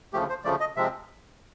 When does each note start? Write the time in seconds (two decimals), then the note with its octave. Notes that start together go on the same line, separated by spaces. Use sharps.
0.13 D2 C#3 F3 A3 G4
0.29 C5
0.44 D2 C#3 F3 A3 D5
0.60 D#5
0.76 C3 F3 G#3 C4 E5